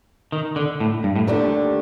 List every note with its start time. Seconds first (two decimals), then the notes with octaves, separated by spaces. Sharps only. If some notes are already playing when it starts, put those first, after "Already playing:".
0.32 D#3
0.56 D3
0.80 A2
1.04 G2
1.16 A2
1.27 D#2 D3 A3 D4 G4